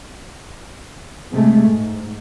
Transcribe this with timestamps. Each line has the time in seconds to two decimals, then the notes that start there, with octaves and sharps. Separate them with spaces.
1.32 C3 G#3 A3
1.68 G#2